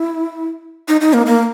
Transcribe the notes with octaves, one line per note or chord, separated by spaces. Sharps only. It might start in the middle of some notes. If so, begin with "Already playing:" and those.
Already playing: E4
D#4
D#4
A#3
A#3